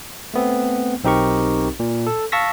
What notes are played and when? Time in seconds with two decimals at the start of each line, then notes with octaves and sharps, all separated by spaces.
0.34 A3 B3 C4
1.04 B1 C4 D#4 G4 A#4 C#6
1.80 A#2
2.07 A4
2.32 F5 A5 C#6 E6 A#6 B6